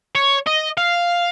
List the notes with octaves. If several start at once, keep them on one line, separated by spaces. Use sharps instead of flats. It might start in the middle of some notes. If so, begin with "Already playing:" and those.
C#5
D#5
F5